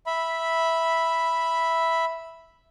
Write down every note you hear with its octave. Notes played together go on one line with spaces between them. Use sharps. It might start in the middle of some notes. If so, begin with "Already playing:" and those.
E5 B5